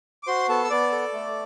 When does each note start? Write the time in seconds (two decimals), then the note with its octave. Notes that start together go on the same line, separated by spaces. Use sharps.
0.23 D6
0.27 F#4 C5 C6
0.49 B3 A4 A5
0.65 E6
0.70 B3 D5 D6
0.92 A4
1.13 A3